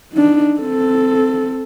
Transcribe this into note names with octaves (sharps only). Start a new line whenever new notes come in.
D4 D#4
C4 A4